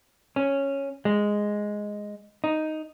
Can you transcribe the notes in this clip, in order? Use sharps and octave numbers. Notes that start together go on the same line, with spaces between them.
C#4
G#3
D#4